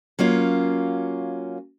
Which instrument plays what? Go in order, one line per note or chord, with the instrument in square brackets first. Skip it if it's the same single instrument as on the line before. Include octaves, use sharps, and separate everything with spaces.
[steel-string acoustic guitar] F#3 A#3 C#4 F4